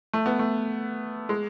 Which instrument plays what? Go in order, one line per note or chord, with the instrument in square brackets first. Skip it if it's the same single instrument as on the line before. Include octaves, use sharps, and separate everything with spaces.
[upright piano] A3
B3
A3
G#3